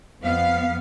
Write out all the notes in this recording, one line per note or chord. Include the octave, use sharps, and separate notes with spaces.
F2 B3 F5